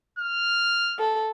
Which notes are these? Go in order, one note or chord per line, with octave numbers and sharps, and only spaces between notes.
F6
A4